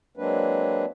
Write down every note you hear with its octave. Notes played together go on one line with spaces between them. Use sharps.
F#3 G#3 A#3 C4 D4 B4